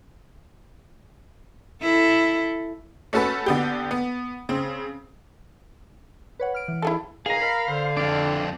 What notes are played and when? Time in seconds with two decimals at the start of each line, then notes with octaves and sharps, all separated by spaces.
1.82 E4 A4
3.13 A3 C#4 F#4 A4 B4
3.46 D3 B3 G4
3.91 B3
4.49 C#3 C4
6.40 B4 C#5 F#5
6.54 F6 D7
6.68 E3
6.82 E4 G#4 A4
7.26 C#2 D#3 G#4 F5 G#5 A#5
7.42 A#4 B5
7.68 D3 C5
7.97 F2 D4 A4 D5 F5